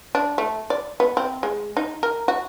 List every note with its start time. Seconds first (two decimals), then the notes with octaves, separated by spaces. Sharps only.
0.15 D4
0.38 A3
0.70 D5
1.00 B3
1.17 C4
1.43 G#3
1.77 D#4
2.03 A#4
2.28 F#4